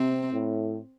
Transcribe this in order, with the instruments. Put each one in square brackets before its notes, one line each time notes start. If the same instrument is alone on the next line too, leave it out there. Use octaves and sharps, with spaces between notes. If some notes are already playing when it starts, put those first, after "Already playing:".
Already playing: [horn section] C3 [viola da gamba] C4
[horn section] A2